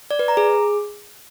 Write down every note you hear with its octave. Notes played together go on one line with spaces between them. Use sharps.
D5
B4
A#5
G#4